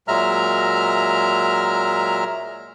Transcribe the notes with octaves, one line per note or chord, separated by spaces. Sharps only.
A#2 F#3 G#3 E5 A#5 F6